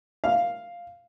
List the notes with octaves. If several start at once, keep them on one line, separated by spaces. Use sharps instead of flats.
F5